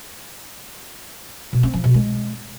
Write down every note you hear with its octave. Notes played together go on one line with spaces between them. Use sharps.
B2
C4
F3
B2
G#3